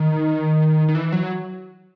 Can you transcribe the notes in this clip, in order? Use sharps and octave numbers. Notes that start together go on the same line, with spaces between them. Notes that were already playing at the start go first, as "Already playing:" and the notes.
Already playing: D#3
D#3
E3
F#3